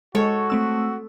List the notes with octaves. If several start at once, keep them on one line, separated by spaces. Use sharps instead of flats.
G#3 F#4 A4 C#5
A3 C4 E6